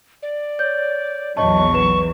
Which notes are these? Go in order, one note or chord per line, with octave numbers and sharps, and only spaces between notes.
D5
C#5 G6
A#1 E2 F#3 C#5 D#5 A5 C#6
B4 E7